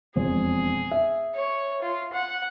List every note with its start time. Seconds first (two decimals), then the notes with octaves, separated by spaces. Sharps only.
0.16 E1 F2 G#4 C5
0.91 E5
1.35 C#5
1.82 F4
2.14 F#5